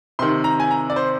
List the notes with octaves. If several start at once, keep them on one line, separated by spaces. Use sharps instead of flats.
C3 D#3 C6
A#5
G#5
A#5
D5
C5